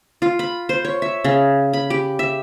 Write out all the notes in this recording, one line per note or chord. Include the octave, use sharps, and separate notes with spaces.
F4
B5
C5
C#5
E5
C#3
B5
G4
E5